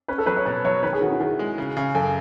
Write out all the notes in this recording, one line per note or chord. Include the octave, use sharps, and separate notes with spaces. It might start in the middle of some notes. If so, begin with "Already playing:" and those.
C#4 B4
A4
F#3 B4
C#5
B2 B4
F#3 C#5
D#3 B4
G#4
D#3 F#4
E4
D#3 G#4
G#3
C#3
C#3
F#2 A4